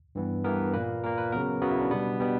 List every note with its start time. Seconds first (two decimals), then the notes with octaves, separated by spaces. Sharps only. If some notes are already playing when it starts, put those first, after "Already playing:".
0.15 G2 E3 B3
0.44 G2 E3 B3 A#4
0.73 A#2 A#3 B4
1.04 A#2 A#3 A#4
1.18 B4
1.32 C#3 F#3 B3 A#4
1.62 C#3 F#3 B3 F#4
1.71 E4
1.81 D4
1.91 B2 G3 B3
2.20 B2 G3 B3